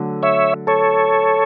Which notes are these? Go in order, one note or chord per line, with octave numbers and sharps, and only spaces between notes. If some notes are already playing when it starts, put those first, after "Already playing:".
Already playing: D3 F#3 A3
C#5 E5
A4 C#5